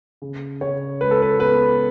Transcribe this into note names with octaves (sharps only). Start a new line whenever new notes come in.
C#3
C#3 C#5
C#2 B4
A4
B4
B3 B4